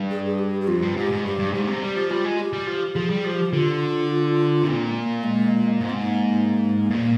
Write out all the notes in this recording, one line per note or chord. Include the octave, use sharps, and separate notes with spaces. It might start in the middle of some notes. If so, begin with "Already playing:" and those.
Already playing: G2
G#4
G#4
G4
G4
F2 F4
G2
G#2 G4
G#2
G2 G4
G2
G#2 G4
C3
G3 G4
F3
G3 F4
G#3
G4
G3
F3
F3 G#4
G3
F3 G4
D3 F4
C3
A#2 C4
G#3
A#3
G#3
G#2 A#3
C4
A#3
G#2
A#2